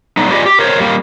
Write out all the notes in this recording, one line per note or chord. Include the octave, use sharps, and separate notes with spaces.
F#3 G3 B3 D#4
F4 G4 G#4 B4 D5 D#5
G4
A#4 C5 C#5
G3 A#3